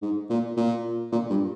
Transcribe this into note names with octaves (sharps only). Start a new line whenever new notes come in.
G#2
A#2
A#2
A#2
G2